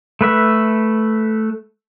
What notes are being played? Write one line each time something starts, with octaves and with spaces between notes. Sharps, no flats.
A3 B4 E5